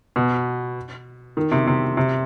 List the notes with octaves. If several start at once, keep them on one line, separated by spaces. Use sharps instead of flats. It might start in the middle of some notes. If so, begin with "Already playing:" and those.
B2
D#3
C3
C3
C3